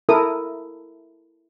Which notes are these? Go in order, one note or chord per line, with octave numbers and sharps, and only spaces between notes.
E4 A4 A#4 D#6